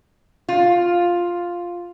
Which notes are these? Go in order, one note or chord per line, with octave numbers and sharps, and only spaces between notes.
F4